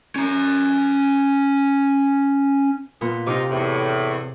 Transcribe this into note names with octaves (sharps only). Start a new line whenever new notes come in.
C#4 A#5
A#2 B3
C3 D#4 F4 G4 D6
E2 A2